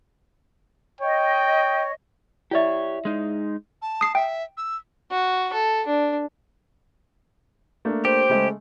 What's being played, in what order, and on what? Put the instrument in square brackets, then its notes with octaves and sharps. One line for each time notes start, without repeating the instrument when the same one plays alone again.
[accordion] C#5 [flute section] D#5 [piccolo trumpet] G5
[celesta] E4 D5 E5 [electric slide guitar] G4 C#5
[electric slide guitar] G#3 D#4
[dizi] A5
[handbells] D#6 C7
[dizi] E5 [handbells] G5
[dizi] E6
[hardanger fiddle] F#4
A4
D4
[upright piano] A3 A#3 D4
[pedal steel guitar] G4 [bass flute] C5
[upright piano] C#3 G#3 A3